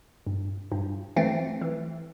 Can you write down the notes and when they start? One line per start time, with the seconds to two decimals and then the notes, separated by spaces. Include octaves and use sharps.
0.27 G2
0.72 G2
1.16 E3 A3 C4
1.62 E3